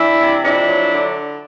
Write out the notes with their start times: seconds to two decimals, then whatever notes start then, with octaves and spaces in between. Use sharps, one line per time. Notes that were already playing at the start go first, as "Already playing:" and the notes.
Already playing: E3 D4 E4
0.19 C3
0.42 F2 D4 E4
0.67 F#3
0.91 D3